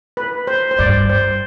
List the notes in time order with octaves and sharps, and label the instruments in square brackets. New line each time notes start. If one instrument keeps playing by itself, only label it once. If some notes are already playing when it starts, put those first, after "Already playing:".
[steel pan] B4
C5
C5
[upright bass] G2 [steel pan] D5
[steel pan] C5